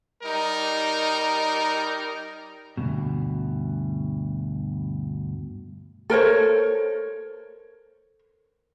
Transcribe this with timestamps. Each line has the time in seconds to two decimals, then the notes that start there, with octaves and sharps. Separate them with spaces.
0.23 G3 D#4 A#4
2.77 D2 G2 B2
6.10 A4 A#4 C5 C#5